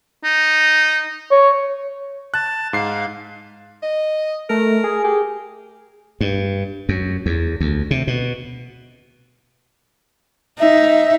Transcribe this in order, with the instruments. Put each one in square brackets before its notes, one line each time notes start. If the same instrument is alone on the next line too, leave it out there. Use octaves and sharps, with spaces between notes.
[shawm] D#4
[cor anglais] C#5
[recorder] A5 [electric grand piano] F#6
[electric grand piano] G#2 C7 [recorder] F5
[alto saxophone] D#5
[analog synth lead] A3 [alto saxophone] A#4
[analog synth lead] G#4
[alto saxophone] G4 [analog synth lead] G#4
[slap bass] G2
F#2
E2
D2
C3
B2
[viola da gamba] D#4 [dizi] E5